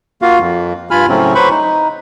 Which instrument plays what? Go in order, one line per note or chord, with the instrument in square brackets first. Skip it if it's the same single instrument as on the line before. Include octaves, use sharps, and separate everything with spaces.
[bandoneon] A#3 F4 F#4 F5
F2
G2 F4 G#5 B5 F6
A2 C#3 F#3 A3 C4 C#4
F#3 B4 C5 B5 C#6
D#4